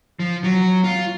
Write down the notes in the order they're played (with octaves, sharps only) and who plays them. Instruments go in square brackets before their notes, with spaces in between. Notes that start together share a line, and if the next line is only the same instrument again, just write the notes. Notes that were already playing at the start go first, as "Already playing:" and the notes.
[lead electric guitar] F3
F#3
F4